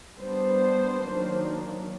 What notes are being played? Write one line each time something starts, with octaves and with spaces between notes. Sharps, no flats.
G3 B3 D4 C5
D#3 F#3 A#3 D4